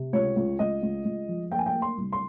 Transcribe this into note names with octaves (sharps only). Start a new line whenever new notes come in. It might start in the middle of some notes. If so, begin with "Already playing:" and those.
Already playing: C3
C#2 C#5
C#2
C#2 D#5
C#2
C#2
F3
A#3 G5
G#5
G5
A#3
C6
C2
C6